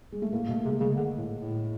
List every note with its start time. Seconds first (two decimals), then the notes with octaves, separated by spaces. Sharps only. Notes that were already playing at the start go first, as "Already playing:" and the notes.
0.12 G#3
0.22 A3
0.33 A2 A#3
0.48 B2 A3
0.64 C3 G#3
0.80 C#3 G#3
0.96 D3
1.18 A2
1.38 A2